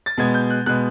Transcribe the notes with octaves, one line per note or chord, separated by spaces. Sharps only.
A6
B2 G#3 B3 G#6
G6
F#6
B2 G#3 B3 F#6